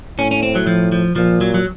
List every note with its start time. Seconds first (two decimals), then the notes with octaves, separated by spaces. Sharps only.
0.18 A2 C#4
0.31 C#4
0.43 C4
0.55 F#3
0.67 F3
0.92 F3
1.16 A#2 F3
1.41 F#3
1.54 F#3